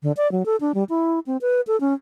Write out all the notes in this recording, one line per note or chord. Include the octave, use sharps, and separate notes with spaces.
D3
D5
F#3
A4
D4
G3
E4
C4
B4
A4
C#4